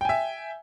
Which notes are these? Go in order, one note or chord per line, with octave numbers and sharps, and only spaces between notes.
E5 G5 G#5